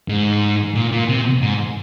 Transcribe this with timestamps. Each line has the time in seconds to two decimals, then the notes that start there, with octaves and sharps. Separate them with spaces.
0.08 G#2
0.75 A#2
0.92 A#2
1.09 C3
1.42 G#2